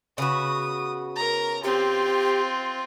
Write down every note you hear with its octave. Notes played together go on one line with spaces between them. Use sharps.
C#3 B3 F#4 D#6
A#4 A#5
C4 F4 G4